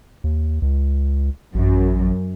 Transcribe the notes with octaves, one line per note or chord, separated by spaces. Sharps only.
D#2
C#2
A1 F#2